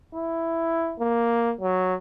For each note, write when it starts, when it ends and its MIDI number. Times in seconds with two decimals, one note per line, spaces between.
0.15 0.95 64
1.00 1.54 58
1.61 1.95 54